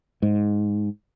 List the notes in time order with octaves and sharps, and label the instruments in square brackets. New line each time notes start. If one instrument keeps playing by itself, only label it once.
[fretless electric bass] G#2